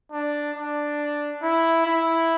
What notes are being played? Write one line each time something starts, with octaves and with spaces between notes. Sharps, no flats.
D4
D4
E4
E4